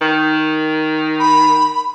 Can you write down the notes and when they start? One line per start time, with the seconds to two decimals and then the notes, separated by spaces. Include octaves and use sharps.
0.01 D#3
1.20 B5